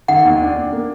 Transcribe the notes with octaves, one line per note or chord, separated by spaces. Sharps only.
D#3 F#5
D#2
D4
D4
A#3